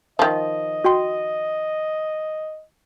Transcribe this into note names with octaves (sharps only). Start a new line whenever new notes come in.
D#3 F3 D#5
F#4 G5 C6